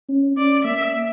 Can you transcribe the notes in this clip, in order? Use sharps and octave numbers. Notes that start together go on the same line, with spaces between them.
C#4
C#4 D5
A#3 E5